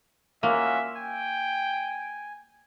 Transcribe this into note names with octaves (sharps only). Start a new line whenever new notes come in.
A#3 C#4 F4 F#4 E5
G5 G#5